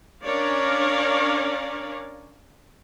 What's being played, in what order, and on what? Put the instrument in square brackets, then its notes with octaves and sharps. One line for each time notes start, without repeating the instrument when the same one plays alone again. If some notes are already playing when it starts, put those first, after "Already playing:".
[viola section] C#4 D4 A#4 C#5 D5 F5